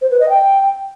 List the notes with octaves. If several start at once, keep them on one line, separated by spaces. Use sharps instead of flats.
C5
B4
D#5
G5